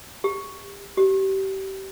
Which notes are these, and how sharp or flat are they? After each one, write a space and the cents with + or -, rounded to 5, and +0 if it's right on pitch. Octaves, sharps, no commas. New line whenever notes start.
G4 +35
G4 -30